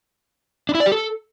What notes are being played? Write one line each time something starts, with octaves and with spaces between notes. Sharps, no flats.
D4
E4
D5
G4
A4